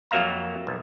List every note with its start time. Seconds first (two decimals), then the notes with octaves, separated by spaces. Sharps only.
0.11 F2 F#3 A#3 E5 F5 A#5
0.67 B1